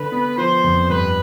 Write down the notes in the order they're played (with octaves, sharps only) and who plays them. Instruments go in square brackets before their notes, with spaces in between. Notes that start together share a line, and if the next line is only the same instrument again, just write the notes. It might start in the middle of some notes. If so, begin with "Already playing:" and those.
Already playing: [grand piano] D3 [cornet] B4
[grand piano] B3
[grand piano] F3 [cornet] C5
[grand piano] F2
[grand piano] G2 [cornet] B4